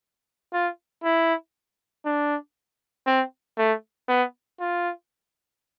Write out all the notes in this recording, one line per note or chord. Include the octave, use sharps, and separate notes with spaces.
F4
E4
D4
C4
A3
B3
F4